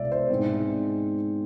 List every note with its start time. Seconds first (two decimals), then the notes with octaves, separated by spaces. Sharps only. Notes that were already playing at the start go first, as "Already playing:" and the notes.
Already playing: C2 B2 G#3 B3 D5 E5
0.12 C5
0.30 G#2 G#3 C4